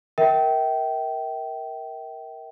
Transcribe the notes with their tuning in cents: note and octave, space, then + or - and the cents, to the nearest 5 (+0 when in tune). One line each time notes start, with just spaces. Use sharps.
A#4 +0 E5 -35 G5 -20